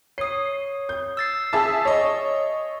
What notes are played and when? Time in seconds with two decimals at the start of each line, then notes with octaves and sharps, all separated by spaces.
0.18 C#5 D#6 C7
0.89 G6
1.17 E6 A6 C7
1.53 G#4 E5 A5
1.85 C#5 D#5